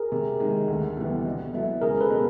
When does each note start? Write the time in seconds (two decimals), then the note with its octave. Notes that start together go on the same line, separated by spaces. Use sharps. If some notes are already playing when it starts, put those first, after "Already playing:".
Already playing: G#4 A#4
0.12 C3
0.40 D#3 G#3
0.68 D2
0.97 C3 E3 G3 B3
1.25 B2
1.54 F#3 B3 E4 A4
1.82 C#2 G#4 A#4
2.01 A4 B4
2.10 B2